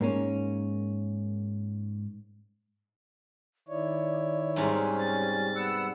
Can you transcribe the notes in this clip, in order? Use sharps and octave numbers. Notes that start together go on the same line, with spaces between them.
G#2 A#3 C#4
D#3 E4 C#5 D5
G#2 C3 G3 C#4
A6
B3 F#5 E6